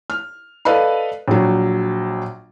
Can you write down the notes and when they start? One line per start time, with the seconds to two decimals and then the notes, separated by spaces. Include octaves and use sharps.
0.10 F6
0.65 A4 B4 D5 D#5 F5 B5
1.28 A#1 F#3